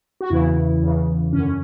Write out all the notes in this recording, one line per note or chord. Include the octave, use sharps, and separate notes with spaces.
F#4
E2 C#3 E3 E4
E2 C#3 E3
F#2 D3 C#4